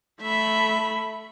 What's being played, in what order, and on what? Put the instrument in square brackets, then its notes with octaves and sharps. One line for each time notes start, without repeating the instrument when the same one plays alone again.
[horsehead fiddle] A3 B5 [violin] E5